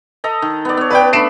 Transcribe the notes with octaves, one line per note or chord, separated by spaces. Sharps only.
A4 D#5 A#5
D#3
B3 D5
B3 C#5
B4 D5 G5
A3 D4 B5 C7 D7 E7